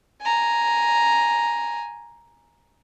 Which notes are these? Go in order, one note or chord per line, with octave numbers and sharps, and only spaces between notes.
G#5 A#5